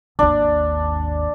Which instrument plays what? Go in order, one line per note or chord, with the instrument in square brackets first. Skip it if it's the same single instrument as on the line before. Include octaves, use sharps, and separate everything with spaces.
[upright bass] G#1 D#2 [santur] D4